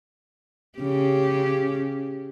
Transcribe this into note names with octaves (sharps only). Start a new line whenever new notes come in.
C#3 G4